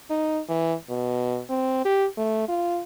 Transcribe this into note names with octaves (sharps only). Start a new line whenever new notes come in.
D#4
E3
B2
C4
G4
A3
F4